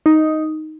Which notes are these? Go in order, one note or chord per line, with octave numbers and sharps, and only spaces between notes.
D#4